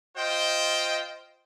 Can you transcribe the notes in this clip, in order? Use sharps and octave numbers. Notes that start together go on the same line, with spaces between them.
F4 C5 D#5 G5